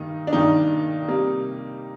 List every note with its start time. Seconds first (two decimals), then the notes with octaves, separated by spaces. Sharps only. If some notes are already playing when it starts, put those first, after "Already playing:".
Already playing: G2 D#3 A#3 D#4
0.27 D4
0.32 G2 D#3 A#3 D#4
1.08 C3 G3 A#3